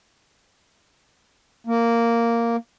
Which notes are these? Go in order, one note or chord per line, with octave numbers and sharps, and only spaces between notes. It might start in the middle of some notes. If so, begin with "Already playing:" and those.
A#3